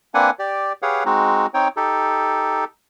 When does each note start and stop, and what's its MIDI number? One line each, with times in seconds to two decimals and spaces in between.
0.14 0.30 58
0.14 0.30 60
0.14 0.30 62
0.14 0.30 71
0.14 0.30 78
0.14 0.30 80
0.39 0.73 67
0.39 0.73 74
0.82 1.04 67
0.82 1.04 68
0.82 1.04 71
0.82 1.04 73
0.82 1.04 77
0.82 1.04 78
1.06 1.47 56
1.06 1.47 60
1.06 1.47 63
1.06 1.47 66
1.54 1.68 60
1.54 1.68 63
1.54 1.68 73
1.54 1.68 79
1.77 2.64 63
1.77 2.64 67
1.77 2.64 69